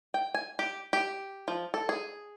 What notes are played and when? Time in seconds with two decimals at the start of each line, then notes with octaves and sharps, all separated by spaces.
0.14 G5
0.34 G#5
0.59 G4
0.93 G4
1.48 F3
1.74 A4
1.89 G#4